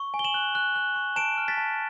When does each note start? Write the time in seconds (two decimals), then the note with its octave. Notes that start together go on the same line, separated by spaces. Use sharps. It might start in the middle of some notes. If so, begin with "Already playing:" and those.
Already playing: C#6
0.14 G#5
0.19 G7
0.24 E7 F#7
0.34 F#6
0.55 F#6
0.76 F#6
0.96 C#6
1.16 A5 D7 E7
1.38 F6
1.48 A6 B6
1.57 A5